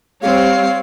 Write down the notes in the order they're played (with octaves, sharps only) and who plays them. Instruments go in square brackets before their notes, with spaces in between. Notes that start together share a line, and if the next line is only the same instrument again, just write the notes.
[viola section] G3 C4 C#5 [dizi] F5